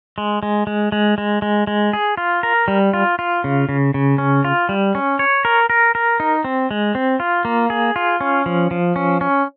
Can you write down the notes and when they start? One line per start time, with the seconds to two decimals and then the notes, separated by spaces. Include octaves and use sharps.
0.18 G#3
0.43 G#3
0.67 G#3
0.92 G#3
1.18 G#3
1.42 G#3
1.67 G#3
1.93 G#4
2.17 F4
2.43 A#4
2.68 G3
2.94 F4
3.19 F4
3.44 C#3
3.69 C#3
3.94 C#3
4.18 C#4
4.44 F4
4.69 G3
4.95 C#4
5.19 C#5
5.45 A#4
5.70 A#4
5.95 A#4
6.20 D#4
6.45 C4
6.71 G#3
6.95 C4
7.20 F4
7.45 A#3
7.70 G#4
7.96 F4
8.21 C#4
8.46 F3
8.71 F3
8.96 C#4
9.21 C#4